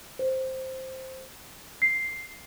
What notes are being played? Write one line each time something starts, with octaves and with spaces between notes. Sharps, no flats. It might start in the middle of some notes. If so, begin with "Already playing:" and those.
C5
C7